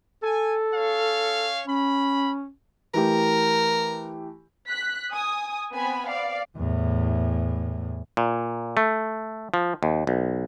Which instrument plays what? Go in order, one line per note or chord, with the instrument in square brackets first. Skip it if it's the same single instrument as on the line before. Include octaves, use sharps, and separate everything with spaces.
[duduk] A4 [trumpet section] G#5
[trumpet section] C#4 C#5 F5
[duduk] C#4 [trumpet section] B5
[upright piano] E3 A3 G4 [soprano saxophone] A#4
[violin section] F#6 B6
G#5 D#6
B3 C4 G#5 B5
D5 F5
[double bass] E2 A2
[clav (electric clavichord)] A#2
A3
F3
D#2
B1